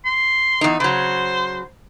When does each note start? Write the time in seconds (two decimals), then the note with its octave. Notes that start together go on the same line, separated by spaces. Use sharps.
0.05 C6
0.61 E2 D#4
0.80 C#3 F#3 C5